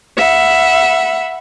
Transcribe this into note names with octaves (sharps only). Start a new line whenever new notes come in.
E5 F#5 B5